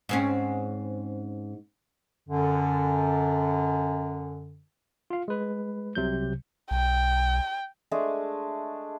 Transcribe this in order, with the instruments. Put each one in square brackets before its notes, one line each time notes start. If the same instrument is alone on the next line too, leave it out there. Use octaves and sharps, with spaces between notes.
[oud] G#2 C4 C#4
[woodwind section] F#2 D3
[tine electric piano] F4 F5
G#3 B4
C2 C3 F#3 G6
[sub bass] B1 [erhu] G5
[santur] G#3 A3 D4 G#4